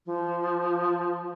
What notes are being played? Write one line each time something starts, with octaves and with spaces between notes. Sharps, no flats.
F3